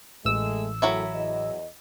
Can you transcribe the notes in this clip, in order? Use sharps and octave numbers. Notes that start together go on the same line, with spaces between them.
A1 G#3 A3 E6
F#2 A2 F#3 E4 E5
E2 D#5